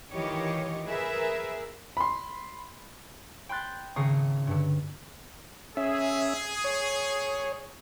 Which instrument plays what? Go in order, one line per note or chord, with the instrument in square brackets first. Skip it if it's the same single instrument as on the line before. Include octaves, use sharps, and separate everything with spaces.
[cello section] D#3 E3 F4 G4 C#5 D#5
G#4 A#4 B4 E5
[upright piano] B5 C6
[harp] G5 B5 C6 F#6 A6
G#1 C#3 A#5 C#6 D#6 C7
G2 D3
[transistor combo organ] C#4 E5 [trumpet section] G#4
[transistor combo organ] C#5